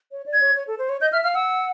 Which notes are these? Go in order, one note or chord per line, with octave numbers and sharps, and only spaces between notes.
C#5
D5
G#6
C#5
C#5
A4
C5
C#5
D#5 G6
E5 F6
F5 F6
F#5 E6